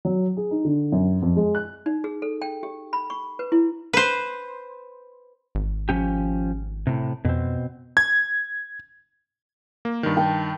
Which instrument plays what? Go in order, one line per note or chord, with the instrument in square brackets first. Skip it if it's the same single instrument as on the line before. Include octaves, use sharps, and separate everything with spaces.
[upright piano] F#3
G#4
D#4
D3
F#2
F2
G#3
F#6
[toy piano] D#4
G#4
A4
G5
G4
B5
C#6
B4
E4
[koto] B4 C5
[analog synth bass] G#1
[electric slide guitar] F3 C#4 G4
A2 C3
[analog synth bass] F2 [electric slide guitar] B2 C4
[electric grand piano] G#6
A#3
G2 D#3
[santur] G5 A5